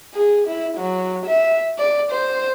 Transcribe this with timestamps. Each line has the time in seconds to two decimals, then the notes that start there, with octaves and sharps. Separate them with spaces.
0.14 G#4
0.47 E4
0.77 F#3
1.26 E5
1.78 D5
2.11 C5